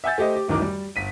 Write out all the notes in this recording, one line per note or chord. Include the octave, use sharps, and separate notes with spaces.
E5 F#5 G#5 E6 G6 A6
A3 G4 C5 D#5
G4
D1 F#2 D#3 E3 A#4 D6
G3
G1 B6 D#7